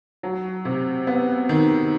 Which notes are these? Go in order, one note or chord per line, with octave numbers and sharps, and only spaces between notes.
F#3
C3
B3
D#3